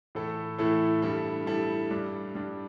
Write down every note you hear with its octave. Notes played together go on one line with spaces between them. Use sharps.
A2 E3 A3 E4 A4
A2 E3 A3 E4 A4
G2 G3 E4 A4
G2 G3 E4 A4
G2 G3 D4
G2 G3 D4